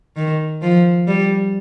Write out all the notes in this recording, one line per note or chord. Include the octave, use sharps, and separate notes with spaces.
D#3
F3
G3